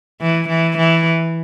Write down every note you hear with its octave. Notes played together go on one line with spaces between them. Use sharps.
E3
E3
E3